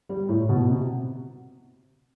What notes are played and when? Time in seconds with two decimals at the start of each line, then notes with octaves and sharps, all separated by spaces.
0.09 G3
0.29 A2
0.49 B2
0.70 C3